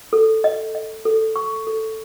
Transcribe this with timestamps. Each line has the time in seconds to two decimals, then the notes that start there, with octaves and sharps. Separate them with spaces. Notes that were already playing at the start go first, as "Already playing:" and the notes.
0.13 A4
0.44 D#5
0.75 D#5
1.05 A4
1.36 C#6
1.67 A4